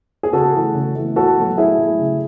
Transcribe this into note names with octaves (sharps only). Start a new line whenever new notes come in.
G#4
C#3 F#4 A4
E3 A3
C#3
E3 A3
A2 F#4 A4
F#3 A3
A2 E4 G#4
F#3 A3
C#3